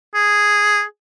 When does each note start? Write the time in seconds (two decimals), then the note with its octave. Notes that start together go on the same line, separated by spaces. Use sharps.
0.15 G#4